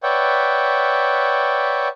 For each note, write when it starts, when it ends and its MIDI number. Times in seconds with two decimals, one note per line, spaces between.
0.03 1.88 71
0.03 1.88 73
0.03 1.88 74
0.03 1.88 76
0.03 1.88 78
0.03 1.88 79